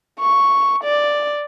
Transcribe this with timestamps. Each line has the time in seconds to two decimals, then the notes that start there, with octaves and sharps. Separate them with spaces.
0.20 C#6
0.84 D5